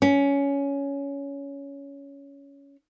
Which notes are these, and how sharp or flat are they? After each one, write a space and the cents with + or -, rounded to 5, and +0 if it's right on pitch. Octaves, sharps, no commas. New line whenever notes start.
C#4 +15